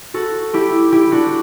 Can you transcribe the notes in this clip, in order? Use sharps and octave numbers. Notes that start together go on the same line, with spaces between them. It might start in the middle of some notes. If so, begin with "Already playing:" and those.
F#4 A4
E4 G4
E4 G4
D4 F#4